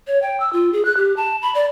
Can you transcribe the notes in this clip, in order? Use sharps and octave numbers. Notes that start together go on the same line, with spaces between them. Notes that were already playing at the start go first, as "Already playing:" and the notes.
C#5
G5
E6
F4
G#4
F#6
G4
A5
B5
D5